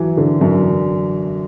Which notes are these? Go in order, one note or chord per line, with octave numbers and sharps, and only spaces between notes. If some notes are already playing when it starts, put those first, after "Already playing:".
Already playing: E3 F#3
D3
F#2